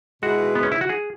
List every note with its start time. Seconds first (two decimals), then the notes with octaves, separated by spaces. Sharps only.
0.23 B2 G#3 E4 F#4 B4
0.55 B3
0.63 C#4
0.72 E4
0.81 F#4
0.89 G#4